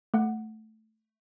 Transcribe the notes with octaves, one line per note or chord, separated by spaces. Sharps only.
A3 F#5